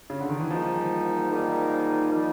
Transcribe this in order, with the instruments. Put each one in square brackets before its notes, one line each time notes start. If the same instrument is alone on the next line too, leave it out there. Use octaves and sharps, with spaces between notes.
[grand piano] C#3
D3
D#3
E3
[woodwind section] G#2 D#3 G3 A#3 D#4 [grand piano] F3
[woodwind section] G#2 D#3 G3 A#3 D#4
[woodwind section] D#3 G3 A#3 D#4 [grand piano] F3